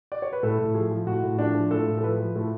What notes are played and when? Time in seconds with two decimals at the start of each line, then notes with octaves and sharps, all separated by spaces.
0.12 D5
0.22 C#5
0.33 B4
0.43 A2 A4
0.59 A2
0.75 F3 G#4
0.91 F3
1.07 A2 F#4
1.23 A2
1.39 F3 D4
1.55 F3
1.71 A2 A4
1.88 A2
1.98 A4
2.03 F3 B4
2.19 F3
2.36 A2 A4